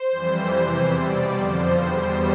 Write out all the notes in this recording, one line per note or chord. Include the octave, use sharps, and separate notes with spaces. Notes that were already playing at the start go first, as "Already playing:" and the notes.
Already playing: C5
F2 E3 G3
E2 C3 E3
B2 G3 D5
F2 D3 F3 C5
E2 B2 G3